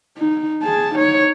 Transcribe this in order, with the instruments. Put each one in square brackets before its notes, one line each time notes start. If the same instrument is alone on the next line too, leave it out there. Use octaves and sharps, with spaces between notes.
[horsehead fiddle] D#4
G#4 A5
D#4 C#5